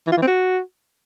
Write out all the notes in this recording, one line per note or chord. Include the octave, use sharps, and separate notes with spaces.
E3
F4
E3
C4
F#4